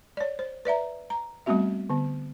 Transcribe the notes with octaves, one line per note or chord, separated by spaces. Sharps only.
C#5 D5
C5
B4 D5 E5 A#5
A#5
G3 A3 B3 C4 F#4 E5
D3 B3